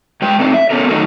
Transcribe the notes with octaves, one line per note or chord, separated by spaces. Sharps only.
G#3 B4 G5
A3 C4 D4 D#4
E5
B3 C#4 A4 A#4
D#3 F#3 A3 D#4 F#4 A4